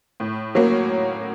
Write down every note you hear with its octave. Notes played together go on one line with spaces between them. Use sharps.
A2
F#3 A#3 C#4